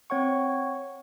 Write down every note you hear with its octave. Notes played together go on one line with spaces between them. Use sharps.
C4 C#5 F#5 C#6